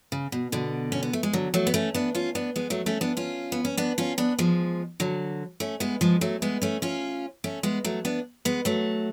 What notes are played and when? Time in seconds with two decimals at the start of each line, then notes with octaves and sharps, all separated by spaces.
0.12 C#3
0.32 B2
0.52 B2 D3
0.92 C#4
1.03 B3
1.13 A3
1.23 G#3
1.33 D3 F#3
1.54 F#3 A3
1.67 B3
1.74 A3 C#4
1.94 B3 D4
2.15 C#4 F4
2.35 B3 D4
2.56 G#3 B3
2.70 F#3 A3
2.86 A3 C#4
3.01 B3 D4
3.17 C#4 F4
3.52 B3
3.65 C#4
3.77 B3 D4
3.98 C#4 F4
4.18 B3 D4
4.39 F3 G#3
5.00 D3 F#3
5.60 A3 C#4
5.80 G#3 B3
6.01 F3 G#3
6.21 F#3 A3
6.42 G#3 B3
6.62 A3 C#4
6.82 C#4 F4
7.44 A3 C#4
7.63 G#3 B3
7.84 F#3 A3
8.05 B3 D4
8.45 G#3 B3
8.65 F#3 A3